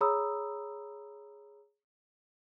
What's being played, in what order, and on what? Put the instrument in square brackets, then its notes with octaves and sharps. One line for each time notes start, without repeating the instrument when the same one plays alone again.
[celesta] G#4 C#5 A#5 B5 D#6 E6